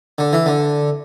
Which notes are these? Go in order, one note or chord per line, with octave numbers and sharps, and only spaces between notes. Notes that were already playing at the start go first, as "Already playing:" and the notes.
D3
E3
D3